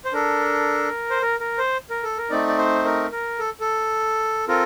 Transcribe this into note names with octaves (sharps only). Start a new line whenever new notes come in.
C5
D4 A4 A#4
C5
A#4
A#4
C5
A#4
A4
A#4
A3 C4 D#4 D5
D5
C5
A#4
A#4
A4
A4
C4 F4 A4 A#4